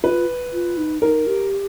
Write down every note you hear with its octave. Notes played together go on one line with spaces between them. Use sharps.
F4 B4
F4
D#4
D#4 A#4
G4